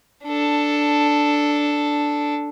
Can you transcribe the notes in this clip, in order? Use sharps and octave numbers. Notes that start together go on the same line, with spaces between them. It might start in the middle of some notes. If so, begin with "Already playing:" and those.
D4 A4